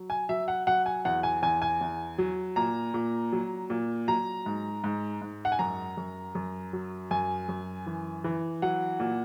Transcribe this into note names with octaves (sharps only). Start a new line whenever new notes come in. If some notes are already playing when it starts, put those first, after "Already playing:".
Already playing: F#3
G#5
F#3 E5
F#5
F#3 F#5
G#5
E2 F#5
G#5
E2 G#5
G#5
E2
F#3
A#2 A#5
A#2
F#3
A#2
F#3 A#5
G#2
G#2
G#2
F#5
G#5
F#2 A#5
F#2
F#2
F#3
F#2 G#5
F#2
E3
E3
F#3 F#5
A#2